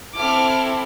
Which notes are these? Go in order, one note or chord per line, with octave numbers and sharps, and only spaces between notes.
C4 E4 A4 D6 F6